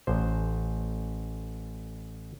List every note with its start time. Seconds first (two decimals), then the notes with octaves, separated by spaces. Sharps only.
0.07 A1 C5